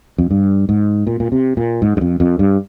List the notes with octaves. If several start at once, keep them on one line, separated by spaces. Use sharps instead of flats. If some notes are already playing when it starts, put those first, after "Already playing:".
F2
G2
G#2
A#2
A#2
C3
A#2
G#2
G2
F2
F2
G2